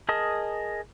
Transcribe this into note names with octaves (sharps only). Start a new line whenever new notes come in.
G#4 A#4 D#5 A5 D#6